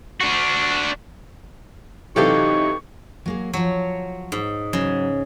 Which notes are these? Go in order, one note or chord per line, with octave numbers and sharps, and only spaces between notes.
D4 F#4
C3 E3 F#3 D#4 G4 A4 F5 C#6
F#3 A#3 G#4
F3 F#3 C#5
G#2
C#3 F#3